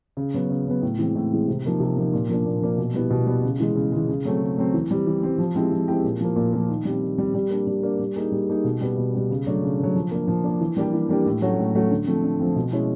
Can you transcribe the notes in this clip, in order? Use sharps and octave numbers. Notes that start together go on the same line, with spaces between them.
C#3
F#3 B3
C#3
F#3 B3
A2
E3 G#3 C4
A2
E3 G#3 C4
C3
F3 A#3 D#4
C3
F3 A#3 D#4
A#2
F3 A#3 D4
A#2
F3 A#3 D4
B2
G3 B3 E4
B2
G3 B3 E4
C#3
E3 G#3
C#3
E3 G#3
C#3
F#3 A3 C4
C#3
F#3 A3 C4
E3
G3 C4
E3
G3 C4
F3
G#3 C4 E4 G4
F3
G#3 C4 E4 G4
A#2
F3 A#3
A#2
F3 A#3
D#3
G3 C4
D#3
G3 C4
G3
A#3 D4
G3
A#3 D4
G3
A#3 D#4 G#4
G3
A#3 D#4 G#4
B2
G3 B3
B2
G3 B3
C#3
F#3 A3 D4
C#3
F#3 A3 D4
F3
A#3 D4
F3
A#3 D4
E3
G3 A#3 D4 G4
E3
G3 A#3 D4 G4
A2
F#3 A3 C#4 F#4
A2
F#3 A3 C#4 F#4
D3
F3 A3 C4
D3
F3 A3 C4
B2
G#3 C#4 E4